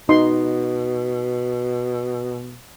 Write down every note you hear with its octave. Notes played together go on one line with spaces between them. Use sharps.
B2 D#4 D#5 C6